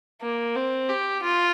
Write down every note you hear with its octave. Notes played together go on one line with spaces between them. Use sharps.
A#3
C4
G4
F4